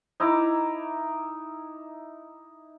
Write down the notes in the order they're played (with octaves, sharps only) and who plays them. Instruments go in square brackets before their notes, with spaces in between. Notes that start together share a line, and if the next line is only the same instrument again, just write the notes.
[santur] D#4 E4 A#5 D6